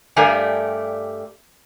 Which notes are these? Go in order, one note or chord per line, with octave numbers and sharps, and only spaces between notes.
G2 G3 A3 A#4 G#5